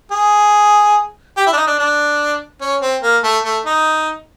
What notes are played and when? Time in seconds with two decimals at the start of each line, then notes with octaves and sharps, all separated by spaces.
0.11 G#4
1.37 G4
1.47 E4
1.53 D4
1.57 D#4
1.67 D4
1.79 D4
2.61 C#4
2.82 C4
3.02 A#3
3.23 A3
3.44 A3
3.66 D#4